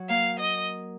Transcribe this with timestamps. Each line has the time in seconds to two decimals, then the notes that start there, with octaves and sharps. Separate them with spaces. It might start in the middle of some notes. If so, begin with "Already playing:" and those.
Already playing: F#3
0.09 A#3 F5
0.39 D#5